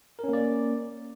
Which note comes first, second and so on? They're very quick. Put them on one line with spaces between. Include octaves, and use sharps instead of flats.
A#4 C#4 A#3 D5